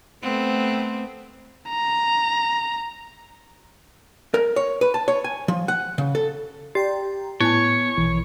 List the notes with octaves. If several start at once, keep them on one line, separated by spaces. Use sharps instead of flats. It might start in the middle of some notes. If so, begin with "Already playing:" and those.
A3 B3 C4
A#5
A#4
C#5
B4
A5
C#5
G#5
F3
F#5
C#3
A4
G4 D5 G5 A#5
A2 B3 E4 C#5 G#5
A#1 B2 E3